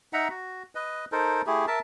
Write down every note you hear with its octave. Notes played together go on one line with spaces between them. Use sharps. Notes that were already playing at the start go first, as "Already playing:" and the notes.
D#4 E5 F#5 A#5
F#4
B4 D#5
D#4 A4 A#4 C5
A3 E4 G4 G#4
A#4 E5 A5